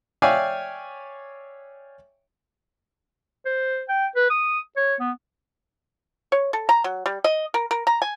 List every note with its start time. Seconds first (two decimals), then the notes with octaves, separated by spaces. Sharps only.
0.22 C#5 D5 E5 F5 G5 G#5
3.45 C5
3.89 G5
4.16 B4
4.30 D#6
4.77 C#5
5.00 B3
6.32 C#5
6.53 A4
6.69 A#5
6.84 F#3
7.06 G3
7.24 D#5
7.54 A#4
7.71 A#4
7.87 A#5
8.02 G#5